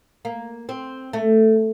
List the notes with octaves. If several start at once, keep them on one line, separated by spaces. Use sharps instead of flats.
A#3
C4
A3